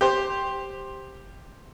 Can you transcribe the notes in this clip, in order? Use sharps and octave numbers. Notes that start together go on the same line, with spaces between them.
G4 C5